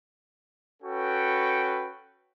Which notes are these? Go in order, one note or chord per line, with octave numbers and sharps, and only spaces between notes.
C#4 F#4 A4 B4 G5